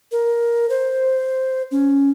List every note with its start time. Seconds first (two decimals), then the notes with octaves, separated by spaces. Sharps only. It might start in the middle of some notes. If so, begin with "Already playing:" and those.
0.12 A#4
0.70 C5
1.71 C#4